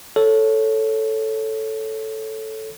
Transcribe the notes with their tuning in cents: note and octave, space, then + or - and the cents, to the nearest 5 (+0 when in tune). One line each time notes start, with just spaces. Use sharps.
A4 +0 C#5 +0